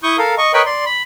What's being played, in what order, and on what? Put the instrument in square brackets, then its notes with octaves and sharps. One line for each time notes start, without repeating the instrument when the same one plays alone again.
[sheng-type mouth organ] E4 C#6 D#6 G6
A4 A#4 F5
D#5 C#6
A#4 B4 C#5 D#5 G5 B5
D5 C6
B5